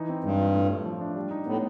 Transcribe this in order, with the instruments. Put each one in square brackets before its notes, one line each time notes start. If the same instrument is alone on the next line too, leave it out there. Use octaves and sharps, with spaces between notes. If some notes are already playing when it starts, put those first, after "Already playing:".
Already playing: [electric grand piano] E3 D#4
C4
[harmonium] G2 [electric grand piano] G#3
[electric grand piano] F4
A2
A3
F3
D4
G3
D#4
[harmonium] A2 [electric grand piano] B3